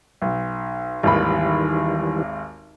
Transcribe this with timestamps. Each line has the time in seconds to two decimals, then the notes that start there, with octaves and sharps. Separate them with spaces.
0.22 B1
1.03 G#1 D#2 D#3 E3 G3 B5